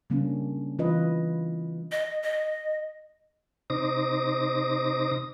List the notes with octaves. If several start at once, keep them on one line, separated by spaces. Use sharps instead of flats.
C#3 G3 A#3 C#4 D4
E3 F4 B4 D#5
D#5
D#5
C3 D#4 C5 D6 D#6 A#6